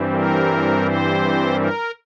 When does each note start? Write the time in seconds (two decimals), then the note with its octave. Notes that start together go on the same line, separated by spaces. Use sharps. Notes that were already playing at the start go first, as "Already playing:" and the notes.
Already playing: G2 E3 G3 C4
0.12 A#4
0.82 C5
1.54 A#4